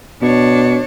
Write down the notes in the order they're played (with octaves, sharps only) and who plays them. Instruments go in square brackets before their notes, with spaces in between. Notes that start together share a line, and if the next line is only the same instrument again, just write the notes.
[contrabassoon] B2 [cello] D4 C#5